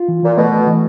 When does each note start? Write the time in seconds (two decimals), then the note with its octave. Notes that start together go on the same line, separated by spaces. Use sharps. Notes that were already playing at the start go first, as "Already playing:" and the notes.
Already playing: F4
0.08 E3
0.23 A#2 E3
0.37 B2 A3
0.53 A3
0.67 E3